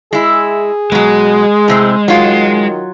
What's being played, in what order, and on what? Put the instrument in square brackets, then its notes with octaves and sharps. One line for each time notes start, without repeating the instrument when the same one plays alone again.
[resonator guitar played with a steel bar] G#3 E4 [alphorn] G#4
[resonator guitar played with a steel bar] B2 F#3 [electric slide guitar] G#3
[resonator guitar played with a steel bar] A2 C3 C4
[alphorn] D#3 [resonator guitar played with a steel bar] F#3 F4